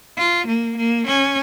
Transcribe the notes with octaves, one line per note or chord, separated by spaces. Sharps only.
F4
A#3
A#3
C#4